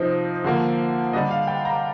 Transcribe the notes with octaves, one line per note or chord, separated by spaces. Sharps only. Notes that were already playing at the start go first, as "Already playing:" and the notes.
Already playing: C3 F3 C4 D#4
D3 F3 A#3
D3 G3 D4 D#5
F5
G5
A#5